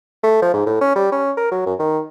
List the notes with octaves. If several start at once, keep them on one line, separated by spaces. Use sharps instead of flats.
A3
F3
G#2
A2
C#4
G3
C#4
A#4
F#3
F#2
D#3